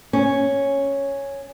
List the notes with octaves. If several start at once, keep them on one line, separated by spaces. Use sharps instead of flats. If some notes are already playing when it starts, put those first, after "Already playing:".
C#4